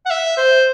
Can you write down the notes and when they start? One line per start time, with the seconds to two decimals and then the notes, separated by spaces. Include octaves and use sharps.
0.06 F#5
0.10 E5
0.37 C5